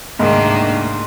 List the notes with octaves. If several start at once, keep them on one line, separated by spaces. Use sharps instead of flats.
D2 G#2 C3 D#3 A#3 D4